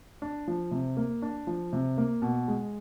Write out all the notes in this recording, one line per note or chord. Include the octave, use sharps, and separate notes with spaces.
D4
F3
C3
A#3
D4
F3
C3
A#3
B2
G#3